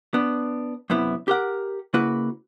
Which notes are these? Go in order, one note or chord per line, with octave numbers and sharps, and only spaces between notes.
B3 D4
F#2 C3 B3 E4
G4 A#4 F#5
C#3 A#3 E4 F#4 B4